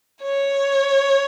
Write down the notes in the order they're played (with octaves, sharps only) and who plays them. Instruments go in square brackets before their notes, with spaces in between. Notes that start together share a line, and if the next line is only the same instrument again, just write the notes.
[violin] C#5